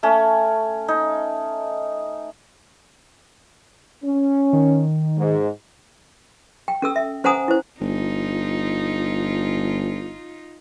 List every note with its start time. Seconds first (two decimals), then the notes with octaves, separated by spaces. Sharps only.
0.03 A3 C#4
0.88 D#4
4.04 C#4
4.53 D#3
5.18 G#2
6.68 G5
6.82 C#4 A4 E6
6.96 E5
7.24 C#4 C5 F#5 G#5 A#5 D#6
7.48 E4 C5
7.80 G1 D#4 F4